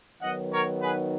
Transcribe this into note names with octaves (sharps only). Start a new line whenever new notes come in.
D#3 F#3 B3 D#4 D#5 F#5
A#4 C#5
G#4 B4